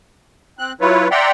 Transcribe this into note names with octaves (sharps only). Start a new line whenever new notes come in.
C4 F#6
F#3 E4 F4 B4 C#5
D5 E5 F#5 G5 A#5 C6